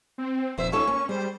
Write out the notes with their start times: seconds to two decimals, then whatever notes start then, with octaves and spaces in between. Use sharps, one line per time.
0.18 C4
0.58 D#1 F2 C5 E5
0.72 C#4 D#4 F4 A4 C#6
0.87 A#3
1.09 G3 G#4 C5